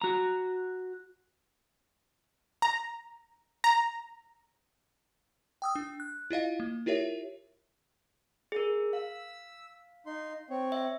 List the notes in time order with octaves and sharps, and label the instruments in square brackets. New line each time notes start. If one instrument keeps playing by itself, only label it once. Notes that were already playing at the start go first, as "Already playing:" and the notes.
[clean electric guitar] F#4 A#5
[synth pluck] A#5
A#5
[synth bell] G5 D#6 E6
D4
F#6
E4 F4 D#5 F5
A#3
E4 F4 G4 A#4 C#5 E5
[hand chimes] G#4 A#4
[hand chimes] F5 [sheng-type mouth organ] E6
[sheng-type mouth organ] D#4 C6
C4 C#5
[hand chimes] E5